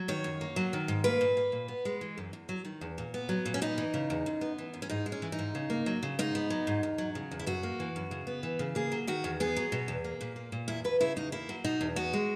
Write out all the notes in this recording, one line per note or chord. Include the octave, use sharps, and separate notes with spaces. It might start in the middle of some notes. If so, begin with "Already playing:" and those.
Already playing: F#3
D#3 C#5
F#2
A#3
F#3
D#3
G#2
A#3 B4
A#2
A#3
A#2
B3
G#3
E3
F#2
E2
F#3
D#3
E2
A#2
B3
F#3
A#2
C#4
B3 D#4
E3
C#3
E2
F#2
B3
E3
F#2
C#4
G#2 D#4
G#3
C#4
E3
D#4
G#2
C#3
A#3
F#3
C#3
G#2 D#4
B3
F#3
G#2
E2
F#3
C#3
E2
E4
F#2 F#4
A#3
E3
F#2
C#3
B3
E3
C#3
A#3 G#4
F#3
D#3 F#4
E2
B3 G#4
F#3
B2
E2
A#3
A#2
A#3
A#2
E2 E4
F#3 B4
C#3 E4
E2 D#4
A#3 E4
F#3
B2 D#4
E2
B3 F#4
G#3